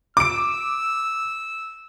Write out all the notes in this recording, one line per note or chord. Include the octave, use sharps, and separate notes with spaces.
D6 E6 D7